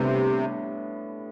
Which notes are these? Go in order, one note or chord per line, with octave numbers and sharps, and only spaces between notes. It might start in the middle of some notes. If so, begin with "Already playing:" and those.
Already playing: A2 C3 G3 B3 D4